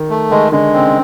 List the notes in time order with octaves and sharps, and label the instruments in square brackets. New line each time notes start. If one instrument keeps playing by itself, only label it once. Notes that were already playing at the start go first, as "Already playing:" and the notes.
Already playing: [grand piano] D#3
[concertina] A3
[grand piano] D#3 [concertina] G#3
[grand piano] D3 [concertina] G#3
[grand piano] C#3 [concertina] C4